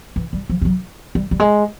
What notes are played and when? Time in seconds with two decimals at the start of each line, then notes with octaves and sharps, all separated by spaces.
0.16 E3
0.33 G3
0.50 F3
0.61 G3
0.65 F#3
1.15 G3
1.31 G3
1.40 G#3